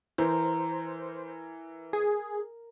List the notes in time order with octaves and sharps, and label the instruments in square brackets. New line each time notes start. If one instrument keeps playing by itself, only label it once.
[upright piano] E3 [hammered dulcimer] A#4 [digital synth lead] C5
[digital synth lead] G#4